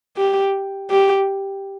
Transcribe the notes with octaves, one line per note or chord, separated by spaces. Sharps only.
G4
G4